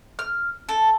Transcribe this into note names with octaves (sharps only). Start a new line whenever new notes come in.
F6
A4